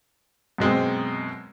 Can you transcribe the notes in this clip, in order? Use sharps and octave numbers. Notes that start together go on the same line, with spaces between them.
F#2 B2 G#3 C4